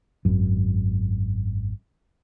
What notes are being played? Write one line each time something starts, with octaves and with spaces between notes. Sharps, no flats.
G#1 F#2